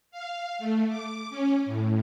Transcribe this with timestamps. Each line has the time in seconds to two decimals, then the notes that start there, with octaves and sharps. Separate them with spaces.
0.11 F5
0.59 A3
0.89 D6
1.30 C#4
1.66 A2